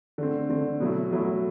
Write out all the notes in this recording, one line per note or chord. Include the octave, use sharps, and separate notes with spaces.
D3 A3 C4
D3 A3 C4
B2 F#3 A3 E4
B2 F#3 A3 E4